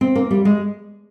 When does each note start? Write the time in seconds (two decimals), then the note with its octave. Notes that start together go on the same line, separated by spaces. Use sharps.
0.01 C4
0.15 A#3
0.31 G3
0.45 G#3